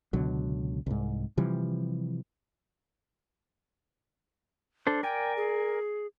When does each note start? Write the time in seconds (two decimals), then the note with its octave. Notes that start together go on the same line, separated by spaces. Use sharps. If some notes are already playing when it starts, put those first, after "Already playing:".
0.13 C#2 B2 D3 F#3
0.86 C2 G#2
1.37 C3 E3 F3 G3
4.87 D4 A4 C5
5.03 A#4 D5 G5 G#5
5.37 G#4